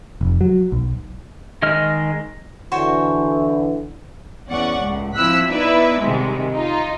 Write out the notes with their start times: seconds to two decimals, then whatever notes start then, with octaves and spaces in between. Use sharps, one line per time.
0.21 F1
0.41 F#3
0.72 B1
1.62 D#3 G#3 D#5 F6
2.72 D3 E3 F#4 C5 C#5
4.48 E2 C#4 D5 F#5 C#6
4.80 C#2 A2
5.16 F3 C4 E4 E6 F#6 B6
5.49 B3 D#4 E4 B4 D5 E5
6.02 G#2 C3 D#3 G3 G#3
6.52 D#4 F4